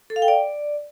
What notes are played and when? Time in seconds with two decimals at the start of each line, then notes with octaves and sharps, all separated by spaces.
0.10 A4
0.16 F5
0.22 G5
0.28 D5